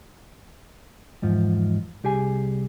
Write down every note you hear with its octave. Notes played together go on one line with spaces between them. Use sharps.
E2 G#2 F3
C2 G4 G#4 G#5